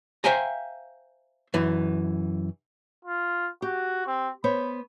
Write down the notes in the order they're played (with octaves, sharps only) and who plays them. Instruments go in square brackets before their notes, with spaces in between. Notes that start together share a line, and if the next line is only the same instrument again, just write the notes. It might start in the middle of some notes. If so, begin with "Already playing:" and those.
[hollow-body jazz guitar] C5 E5 F5 G5 G#5 A#5
F#2 E3
[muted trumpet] F4
[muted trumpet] F#4 [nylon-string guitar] G4
[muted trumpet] C4
[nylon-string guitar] B3 C5 C#5 [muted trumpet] B5